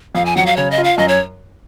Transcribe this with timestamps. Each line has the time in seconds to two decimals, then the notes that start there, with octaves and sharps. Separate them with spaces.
0.15 F2 F5
0.26 G#5
0.36 F#3 F#5
0.46 F5
0.57 C#3 C#5
0.71 D#5
0.78 F4
0.84 F5
0.98 F#2 D#5
1.08 C#5